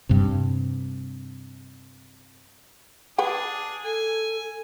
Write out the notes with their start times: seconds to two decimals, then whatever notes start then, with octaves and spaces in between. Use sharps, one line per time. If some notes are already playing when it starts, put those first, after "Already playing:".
0.09 G2 C3
3.18 D4 G#4 B4 F#5 G5
3.85 A4 G#5